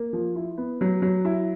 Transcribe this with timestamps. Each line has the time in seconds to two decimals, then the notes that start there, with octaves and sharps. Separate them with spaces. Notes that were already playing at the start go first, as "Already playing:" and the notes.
Already playing: A#3
0.13 F3
0.35 E4
0.57 B3
0.81 F#3
1.02 F#3
1.25 E4